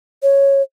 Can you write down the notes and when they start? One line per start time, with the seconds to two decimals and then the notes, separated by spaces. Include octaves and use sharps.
0.23 C#5